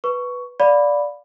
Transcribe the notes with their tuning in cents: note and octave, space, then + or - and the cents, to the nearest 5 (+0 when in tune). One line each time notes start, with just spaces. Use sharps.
B4 +0 C#6 +10
D5 -5 F5 +35 B5 +0